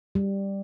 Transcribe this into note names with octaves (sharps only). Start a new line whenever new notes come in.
G3